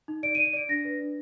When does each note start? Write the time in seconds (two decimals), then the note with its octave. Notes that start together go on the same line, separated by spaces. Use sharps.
0.08 D#4
0.23 D5 D7
0.35 D#7
0.38 D5
0.45 D#7
0.53 D5 D7
0.69 D4 A#6
0.85 B4
1.00 D4